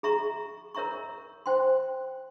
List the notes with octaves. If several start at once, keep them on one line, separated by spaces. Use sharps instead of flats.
G#4 E5 A#5 C#6
A#4 C#5 E5 A#5 C#6
C5 G5 C6